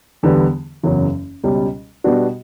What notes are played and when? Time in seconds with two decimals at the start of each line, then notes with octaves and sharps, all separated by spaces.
0.23 E2 D3 G3 B3
0.83 F#1 E2 C#3 F#3
1.44 C#2 B2 G3 C#4
2.04 B2 G3 B3 D4 F#4